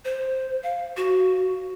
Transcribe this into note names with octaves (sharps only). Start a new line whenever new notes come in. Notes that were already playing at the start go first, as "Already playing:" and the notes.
C5
F5
F#4